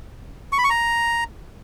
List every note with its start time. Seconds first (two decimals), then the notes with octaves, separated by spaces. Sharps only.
0.52 C#6
0.58 B5
0.64 C#6
0.70 A#5